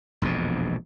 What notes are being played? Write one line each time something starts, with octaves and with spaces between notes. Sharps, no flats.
E1 A#1 F2 B2